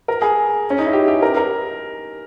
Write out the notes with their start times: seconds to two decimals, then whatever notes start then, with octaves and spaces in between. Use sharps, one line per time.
0.08 A#4
0.22 G#4
0.70 C#4
0.78 D#4
0.86 E4
0.93 G4
1.08 G4
1.22 A#4
1.37 A#4